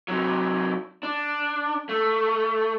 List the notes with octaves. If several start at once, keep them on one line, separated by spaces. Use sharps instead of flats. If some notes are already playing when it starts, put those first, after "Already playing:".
C3 F#3
D4
A3